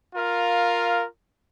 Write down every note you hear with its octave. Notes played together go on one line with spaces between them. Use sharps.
F4 A#4 F5